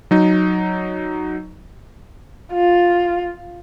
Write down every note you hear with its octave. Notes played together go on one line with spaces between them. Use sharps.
F#3 D#4
F4